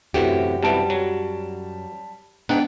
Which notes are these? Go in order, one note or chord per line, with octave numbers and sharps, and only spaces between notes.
F#2 A2 C3 E3 F#4 G4
C3 E3 G3 B3 A5 D7
F#3
G#2 B3 D4 D#4 F#5 G5